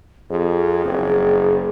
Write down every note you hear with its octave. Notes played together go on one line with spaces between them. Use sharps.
F2 G#4
F#1